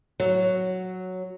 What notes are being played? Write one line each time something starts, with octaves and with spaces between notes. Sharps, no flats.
F#3